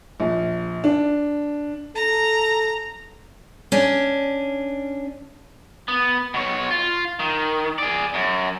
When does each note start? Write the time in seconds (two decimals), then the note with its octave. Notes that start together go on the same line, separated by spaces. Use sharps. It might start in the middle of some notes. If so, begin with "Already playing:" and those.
0.20 A#1
0.84 D4
1.95 A4 A#5
3.72 C#4 D4
5.88 B3
6.34 B2 C#5
6.71 F4
7.19 D#3
7.78 G#4 D5
8.14 F#2